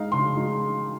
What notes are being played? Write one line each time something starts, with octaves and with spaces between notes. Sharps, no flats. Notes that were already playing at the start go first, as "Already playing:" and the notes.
Already playing: G#3 D#4 F5
C#3 C6
G#3 D#4